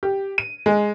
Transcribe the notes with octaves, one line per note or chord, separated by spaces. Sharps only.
G4
D#7
G#3